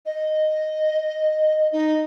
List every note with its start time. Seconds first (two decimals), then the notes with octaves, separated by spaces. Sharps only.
0.05 D#5
1.72 D#4